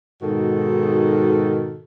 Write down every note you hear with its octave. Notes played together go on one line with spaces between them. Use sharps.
G#2 B2 D#3 F#4 A4